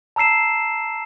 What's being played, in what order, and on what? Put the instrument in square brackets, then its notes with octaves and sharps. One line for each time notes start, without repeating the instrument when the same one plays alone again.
[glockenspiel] A5 A#5 E6 C7 E7